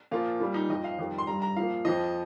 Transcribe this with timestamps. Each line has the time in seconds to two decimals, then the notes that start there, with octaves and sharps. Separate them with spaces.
0.11 A#2 F3 F4
0.40 A#2 G3
0.54 D#4
0.69 F2 F3 D#5
0.84 F5
0.99 F2 D#3 G3
1.18 C6
1.27 G2 G3 A#5
1.42 A#5
1.56 F3 F5
1.61 A#2
1.85 F2 F3 D#5